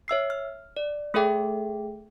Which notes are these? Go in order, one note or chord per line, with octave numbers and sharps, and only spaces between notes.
C#5 E5 E6 C7
F6
D5
A3 G#4 A4 E5 G5 D6